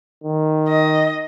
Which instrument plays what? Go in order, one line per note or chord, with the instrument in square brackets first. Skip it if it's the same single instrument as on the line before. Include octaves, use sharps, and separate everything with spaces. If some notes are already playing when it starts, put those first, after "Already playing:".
[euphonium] D#3
[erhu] D#5